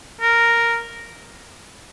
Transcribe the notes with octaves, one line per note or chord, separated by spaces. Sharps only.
A#4